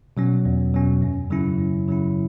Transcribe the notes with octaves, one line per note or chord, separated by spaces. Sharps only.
B2 F#3 C#4
E2
B2 F#3 C#4
F#2
C#3 F#3 C#4 E4
F#2
C#3 F#3 C#4 E4